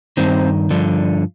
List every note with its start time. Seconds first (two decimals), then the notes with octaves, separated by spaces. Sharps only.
0.17 G2 D#3 C4
0.71 G2 D3 F3